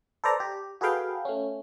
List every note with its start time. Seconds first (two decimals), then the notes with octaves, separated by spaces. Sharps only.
0.24 A4 B4 C5 D5 A#5
0.40 G4
0.81 F#4 G#4 A4 B4 F5 G5
1.25 A3 C#4